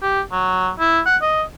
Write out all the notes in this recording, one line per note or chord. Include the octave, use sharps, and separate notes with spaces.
G4
F#3
E4
F#5
D#5